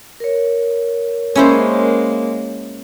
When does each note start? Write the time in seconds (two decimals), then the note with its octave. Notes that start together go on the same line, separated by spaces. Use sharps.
0.20 A#4 C#5
1.35 G#3 A#3 C#4 E4 C5